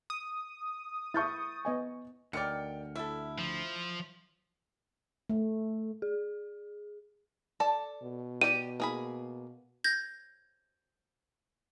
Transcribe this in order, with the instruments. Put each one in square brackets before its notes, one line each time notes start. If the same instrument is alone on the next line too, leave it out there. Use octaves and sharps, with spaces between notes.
[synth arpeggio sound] D#6
[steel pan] E4 E5 [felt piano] C#6 G6 A6
[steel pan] B3 D#5 G#5
[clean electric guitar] D2 [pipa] D#3 D5 [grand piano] G5 F6 C#7
[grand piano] E4 [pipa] A4 E5
[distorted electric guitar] F3
[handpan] A3
[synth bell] G#4
[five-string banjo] A4 D5 A5
[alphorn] B2
[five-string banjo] G4 D5 G5 [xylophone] D#7
[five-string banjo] A#3 G#4 B5
[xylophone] G6 G#6 A#6